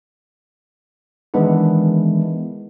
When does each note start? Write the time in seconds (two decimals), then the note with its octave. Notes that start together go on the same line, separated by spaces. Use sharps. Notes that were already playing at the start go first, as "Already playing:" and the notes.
1.34 D#3 E3 G#3 B3 D4 E4